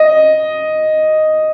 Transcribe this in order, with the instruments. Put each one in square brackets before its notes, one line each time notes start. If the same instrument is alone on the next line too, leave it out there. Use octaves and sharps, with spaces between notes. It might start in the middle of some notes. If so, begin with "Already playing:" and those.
Already playing: [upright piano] D#5